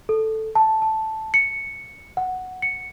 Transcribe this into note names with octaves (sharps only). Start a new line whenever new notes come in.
A4
A5
A5
C#7
F#5
C#7